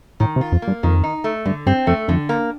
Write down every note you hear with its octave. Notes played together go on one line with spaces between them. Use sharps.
A2 D#3
C3
F4
F2
A#3
G2
F2 D#3
D#4
A3
G2 D3
G2 C4
F2 A3
F2 D3
A#3